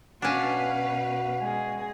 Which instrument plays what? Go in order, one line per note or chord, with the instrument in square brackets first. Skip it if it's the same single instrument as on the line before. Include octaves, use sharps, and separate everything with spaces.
[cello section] B2 B4 F5 [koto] C#4 D4 [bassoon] F#4
[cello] G#3 G#4